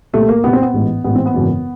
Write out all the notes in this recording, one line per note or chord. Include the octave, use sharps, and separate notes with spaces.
C2 A#2 A3
A#3
C2 A#2 B3
C4
B3
A1 G#2 E3
A1 G#2 E3 B3
C4
B3
G#1 F#2 C#3 E3